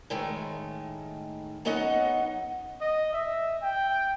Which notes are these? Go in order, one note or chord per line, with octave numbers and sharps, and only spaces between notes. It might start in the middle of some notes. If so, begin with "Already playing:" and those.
A2 D#3 G#3 A3
F#3 B3 C#4 D#4 D#5 F#5
D#5
E5
G5